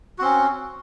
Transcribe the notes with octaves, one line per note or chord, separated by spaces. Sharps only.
C4 C#4 F#4